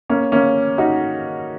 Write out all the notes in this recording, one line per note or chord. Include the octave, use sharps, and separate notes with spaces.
A#3 C#4
A#3 C#4
D#4 F#4